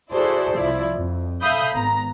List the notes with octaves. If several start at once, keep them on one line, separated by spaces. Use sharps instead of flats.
E4 F#4 G#4 A4 C5 D5
C2 F3 E4 D5
F2
A4 E5 F5 B5 D#6 G6
G#1 B3 A#5